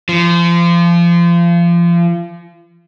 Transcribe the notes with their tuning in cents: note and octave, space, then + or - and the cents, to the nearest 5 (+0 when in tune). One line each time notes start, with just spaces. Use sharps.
F3 -30